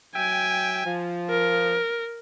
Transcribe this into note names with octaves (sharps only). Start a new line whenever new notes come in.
F#3 E5 G5 G#5
F3
A#4